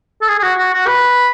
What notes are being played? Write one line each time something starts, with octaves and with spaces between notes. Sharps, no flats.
A4
G#4
G#4
F#4
F#4
F#4
B4